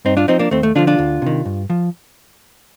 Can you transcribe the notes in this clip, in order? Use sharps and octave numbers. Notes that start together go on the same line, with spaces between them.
G2 C4 D#4
D4 F4
F3 C4 D#4
A#3 D4
D#2 A3 C4
A3
D3 F3 D4 F4
D4 F4
D2
C3 D#3
G2
F3